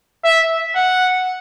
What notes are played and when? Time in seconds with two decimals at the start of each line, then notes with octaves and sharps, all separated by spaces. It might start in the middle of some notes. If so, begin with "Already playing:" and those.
0.24 E5
0.75 F#5